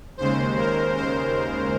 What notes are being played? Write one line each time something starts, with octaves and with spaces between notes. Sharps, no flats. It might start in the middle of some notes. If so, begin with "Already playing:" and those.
D#2 C#3 G#3 C5
A#4
C5